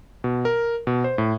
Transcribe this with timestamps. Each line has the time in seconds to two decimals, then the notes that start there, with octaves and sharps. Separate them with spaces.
0.24 B2
0.45 A#4
0.87 B2
1.04 C5
1.18 A2